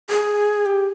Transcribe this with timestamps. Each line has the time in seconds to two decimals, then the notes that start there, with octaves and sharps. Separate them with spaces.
0.10 G#4
0.66 G4